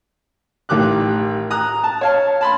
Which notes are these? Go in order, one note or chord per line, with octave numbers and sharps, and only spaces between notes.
A1 D#3 G4 D6 F#6
A#5 D#6 F#6
A5
C#5 F5 A5
A5 B5 C6